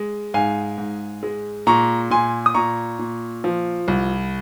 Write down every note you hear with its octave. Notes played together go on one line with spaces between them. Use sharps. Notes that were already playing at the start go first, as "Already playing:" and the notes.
Already playing: G#3
G#2 F5 G#5
G#2
G#3
A#2 A#5 C#6
A#2 G#5 C6
D#6
A#2 A#5 C#6
A#2
F3
C2